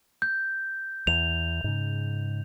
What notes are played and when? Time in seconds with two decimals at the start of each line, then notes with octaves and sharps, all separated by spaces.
0.22 G6
1.07 E2 F7
1.64 G#2 C#3